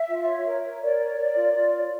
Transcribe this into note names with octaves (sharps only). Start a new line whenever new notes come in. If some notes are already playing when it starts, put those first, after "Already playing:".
Already playing: E5
F4
C#5
A#4
C#5
A#4 D5
C#5
A#4
F4
F4
C#5